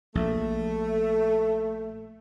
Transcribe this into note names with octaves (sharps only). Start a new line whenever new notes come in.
A#1 A3